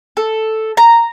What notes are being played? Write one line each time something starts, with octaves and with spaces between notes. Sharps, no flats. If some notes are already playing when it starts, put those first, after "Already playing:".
A4
A#5